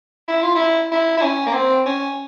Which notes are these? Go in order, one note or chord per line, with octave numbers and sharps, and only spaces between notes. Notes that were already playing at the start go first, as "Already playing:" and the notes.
E4
F4
E4
E4
E4
C#4
A#3
C4
C#4